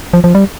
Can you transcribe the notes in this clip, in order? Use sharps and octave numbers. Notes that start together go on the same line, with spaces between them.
F3
F3
G3